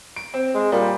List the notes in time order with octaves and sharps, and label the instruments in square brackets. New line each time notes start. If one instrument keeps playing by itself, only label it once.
[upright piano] D7
C4
[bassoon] G#3
[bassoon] A#2 [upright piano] G3